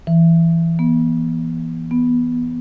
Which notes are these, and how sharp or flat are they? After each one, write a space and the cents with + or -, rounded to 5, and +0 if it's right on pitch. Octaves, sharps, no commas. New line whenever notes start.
E3 +10
B3 -40
B3 -10